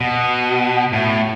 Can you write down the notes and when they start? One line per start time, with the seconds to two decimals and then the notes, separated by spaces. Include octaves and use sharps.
0.01 B2
0.93 A2